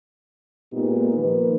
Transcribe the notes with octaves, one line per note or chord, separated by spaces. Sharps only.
A#2 G#3 B3 D#4 G4
D#3 F3 A#3 B4